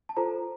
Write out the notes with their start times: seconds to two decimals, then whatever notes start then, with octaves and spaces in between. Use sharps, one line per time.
0.09 A5
0.16 F4 A4 C5 A#5